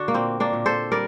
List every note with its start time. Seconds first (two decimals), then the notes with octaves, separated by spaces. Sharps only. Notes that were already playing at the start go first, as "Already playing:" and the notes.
Already playing: D3 D4 F#4
0.08 A#3
0.14 A#2 C4
0.40 A#3 D4
0.53 A#2
0.66 A4 C5
0.92 G3 A#4 D5